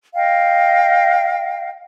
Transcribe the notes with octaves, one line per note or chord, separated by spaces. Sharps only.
D#5 F5 G5